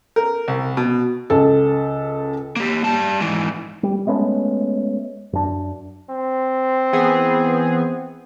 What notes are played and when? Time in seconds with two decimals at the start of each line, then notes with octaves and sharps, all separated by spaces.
0.16 A#4
0.48 C2
0.77 B2
1.30 C#2 A4
2.56 A#3 G4
2.84 G3 A5
3.21 G#2 E3
3.83 G3
4.07 G#3 A3 B3 C#4
5.33 F#2 D4
6.09 C4
6.93 E3 B3 G#4